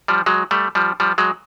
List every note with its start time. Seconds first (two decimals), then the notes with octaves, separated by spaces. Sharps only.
0.08 F3 G3
0.26 F#3 G#3
0.51 G3 A3
0.75 F3 G3
1.00 F3 G3
1.18 F#3 G#3